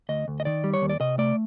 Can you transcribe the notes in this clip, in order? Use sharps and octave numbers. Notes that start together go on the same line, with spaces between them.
D2 D#5
D2
D#5
D#3 D5
G3
C#5
D#2
D5
C3 D#5
A3 D5